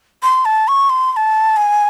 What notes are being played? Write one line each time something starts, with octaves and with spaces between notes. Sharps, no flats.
C6
A5
C#6
C6
C6
A5
G#5